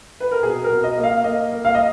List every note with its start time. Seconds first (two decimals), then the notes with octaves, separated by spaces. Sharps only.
0.20 B4
0.31 A#4
0.43 B2 G#4
0.64 A#4
0.70 B2
0.84 D#5
0.97 A#3
1.04 F5
1.24 A#3 D#5
1.52 A#3
1.65 F5
1.75 D#5